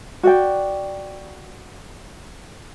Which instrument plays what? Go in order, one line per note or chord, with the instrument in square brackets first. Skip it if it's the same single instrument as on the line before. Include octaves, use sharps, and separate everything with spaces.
[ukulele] F#4 D5 G5